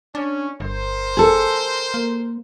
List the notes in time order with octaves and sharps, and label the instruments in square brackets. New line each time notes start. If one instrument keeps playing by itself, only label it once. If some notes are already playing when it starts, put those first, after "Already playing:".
[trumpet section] C#4 [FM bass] D4
[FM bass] G1 [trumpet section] A#4 C5
[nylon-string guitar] G#4 A4
[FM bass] A#3